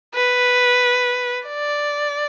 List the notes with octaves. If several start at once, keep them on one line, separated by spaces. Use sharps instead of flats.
B4
D5